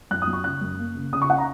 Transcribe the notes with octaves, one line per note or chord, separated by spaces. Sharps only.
F#2 F#6
D#6
F#3
C#6
C#3 F#6
F#2
A#3
C#3
C#3 D#6
C#6
F#5
A#5